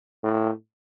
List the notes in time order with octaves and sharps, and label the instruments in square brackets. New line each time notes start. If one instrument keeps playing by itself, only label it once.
[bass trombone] A2